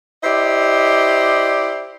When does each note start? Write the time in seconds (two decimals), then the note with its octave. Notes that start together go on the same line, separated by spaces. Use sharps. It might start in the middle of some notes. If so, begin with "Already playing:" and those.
0.24 E4 G4 C5 D5 D#5